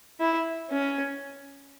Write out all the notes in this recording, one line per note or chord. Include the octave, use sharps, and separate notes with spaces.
E4
C#4